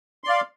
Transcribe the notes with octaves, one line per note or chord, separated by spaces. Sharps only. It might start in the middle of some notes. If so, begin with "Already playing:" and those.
D5 F5 C6